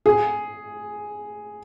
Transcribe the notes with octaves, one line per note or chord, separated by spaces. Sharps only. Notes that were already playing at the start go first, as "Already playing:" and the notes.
G#4